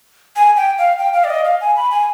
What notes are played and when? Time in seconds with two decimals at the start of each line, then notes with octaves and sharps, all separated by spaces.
0.36 G#5
0.57 G5
0.78 F5
0.98 G5
1.13 F5
1.24 D5
1.30 D#5
1.45 F5
1.61 G#5
1.76 B5
1.91 G#5